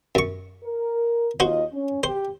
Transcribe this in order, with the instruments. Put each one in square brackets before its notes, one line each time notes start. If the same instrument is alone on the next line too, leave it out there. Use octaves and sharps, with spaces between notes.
[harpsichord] F#2 C#6
[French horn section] A#4
[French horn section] D#2 F4 D#5 [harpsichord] F#4 C5
[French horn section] C#4
[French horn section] G4 [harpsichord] C5